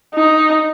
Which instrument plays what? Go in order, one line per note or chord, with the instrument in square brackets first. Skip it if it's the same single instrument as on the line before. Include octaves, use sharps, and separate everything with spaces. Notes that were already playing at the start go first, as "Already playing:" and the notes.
[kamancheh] D#4